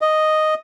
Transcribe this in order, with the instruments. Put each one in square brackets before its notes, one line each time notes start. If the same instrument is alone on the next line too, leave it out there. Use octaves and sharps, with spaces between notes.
[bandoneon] D#5